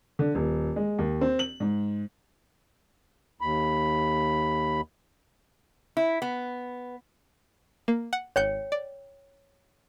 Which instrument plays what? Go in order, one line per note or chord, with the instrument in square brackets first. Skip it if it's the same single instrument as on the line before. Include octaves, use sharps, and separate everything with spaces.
[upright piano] D3
D#1
G#3
D#2
C4
F#7
G#2
[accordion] D#2 B5
[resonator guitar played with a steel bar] E4
B3
[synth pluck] A#3
F#5
[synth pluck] G#1 F#6 G6 [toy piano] C#5 G5
[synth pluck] D5